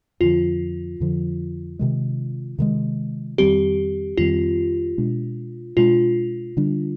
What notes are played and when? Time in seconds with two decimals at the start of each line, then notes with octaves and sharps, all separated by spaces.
0.21 F2 D3 F3 F4
1.00 F2 D3 F3
1.79 C3 D#3 G#3
2.59 C3 D#3 G#3
3.38 F2 D#3 G3 C4 G4
4.17 F2 D#3 G3 C4 F4
4.98 B2 G#3 D4
5.77 B2 G#3 D4 F4
6.57 D3 G3 D4